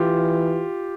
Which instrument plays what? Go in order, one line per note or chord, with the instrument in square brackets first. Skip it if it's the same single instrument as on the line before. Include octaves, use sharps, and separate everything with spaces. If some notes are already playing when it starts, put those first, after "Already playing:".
Already playing: [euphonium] E3 [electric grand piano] F4 G4